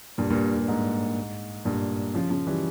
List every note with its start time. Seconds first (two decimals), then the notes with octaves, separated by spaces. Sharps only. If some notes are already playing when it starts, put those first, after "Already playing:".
0.18 G2 A#2
0.30 G2 A#2
0.55 G2
0.68 G#2
1.65 G2 A#2
2.14 C#3 F3
2.30 C#3 F3
2.47 E3 G3